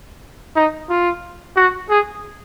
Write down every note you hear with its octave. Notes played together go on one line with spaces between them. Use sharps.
D#4
F4
F#4
G#4